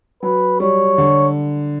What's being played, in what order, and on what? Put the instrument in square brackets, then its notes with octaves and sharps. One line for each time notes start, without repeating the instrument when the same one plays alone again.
[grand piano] F#3 [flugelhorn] B4
[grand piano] G3 [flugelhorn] C#5
[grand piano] D3